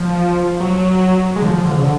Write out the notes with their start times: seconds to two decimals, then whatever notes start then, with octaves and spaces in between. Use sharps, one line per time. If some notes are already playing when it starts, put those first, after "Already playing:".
Already playing: F3
0.60 F#3
1.36 G#3
1.42 D3
1.45 F3
1.56 F3
1.66 D3
1.75 C#3
1.83 D3